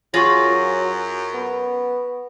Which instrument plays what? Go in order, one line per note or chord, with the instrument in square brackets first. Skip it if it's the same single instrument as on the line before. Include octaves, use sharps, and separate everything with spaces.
[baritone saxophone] F#2 [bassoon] F#3 [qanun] F4 G#4 B5 [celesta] C#6 A#6
[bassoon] B3